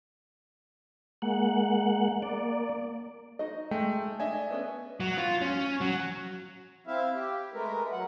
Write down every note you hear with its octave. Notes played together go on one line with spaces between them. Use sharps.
G#3 A#3 F#5
A#3 D5
D#4 F#4 D#5
G#3 A3 G5
D4 D#5 E5 G#5
B3 C#4 B4
F#3
F4
C#4
F#3
C4 E4 E5 F5
G4
G#3 A3 A#4 B4
F#3 F#5